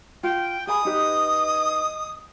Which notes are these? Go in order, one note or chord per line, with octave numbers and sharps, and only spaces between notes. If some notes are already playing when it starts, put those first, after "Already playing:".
F4 G5
G#4 G#5 B5 D#6
D#4 G4 B4 D#5